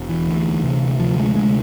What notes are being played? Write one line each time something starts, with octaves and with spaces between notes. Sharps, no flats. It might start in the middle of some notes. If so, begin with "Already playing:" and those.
Already playing: E1
E3
D2
C3
D2 F3
G#3
C3 G#3